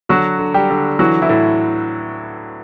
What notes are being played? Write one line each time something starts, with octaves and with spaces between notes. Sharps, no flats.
D3 F#3 F#4
D3
G3 G4
D3
E3 F#3 F#4
E3 E4
A2